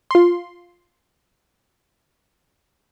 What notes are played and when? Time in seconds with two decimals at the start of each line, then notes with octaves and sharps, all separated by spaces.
0.11 F4 C6